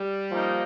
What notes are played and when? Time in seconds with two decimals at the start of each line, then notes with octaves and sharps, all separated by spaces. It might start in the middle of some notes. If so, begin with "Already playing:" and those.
Already playing: G3
0.32 F3 A#3 D#4